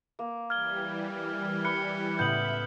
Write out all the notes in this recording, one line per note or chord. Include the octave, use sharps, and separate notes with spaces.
A#3
E3 G3 F6 G#6 G7
B5 F#6 C#7 G7
C#2 A2 B3 E5 G6 E7 F#7